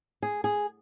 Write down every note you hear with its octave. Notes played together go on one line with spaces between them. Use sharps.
G#4
G#4